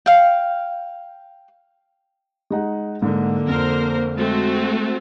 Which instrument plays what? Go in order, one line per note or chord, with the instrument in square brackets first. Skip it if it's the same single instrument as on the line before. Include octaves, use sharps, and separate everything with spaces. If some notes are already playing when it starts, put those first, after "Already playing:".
[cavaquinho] F5 G5
[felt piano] G#3 D#4 F#5
[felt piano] G#2 [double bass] D3 A#3
[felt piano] F2 [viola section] A#4 C5
[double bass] G#3 [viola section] A3 C4 F#4